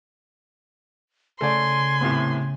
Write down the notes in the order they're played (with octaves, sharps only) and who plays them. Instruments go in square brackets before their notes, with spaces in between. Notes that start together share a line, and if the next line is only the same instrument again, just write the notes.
[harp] C#3 [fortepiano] A3 D5 [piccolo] G#5 [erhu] C6
[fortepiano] A2 C3 B3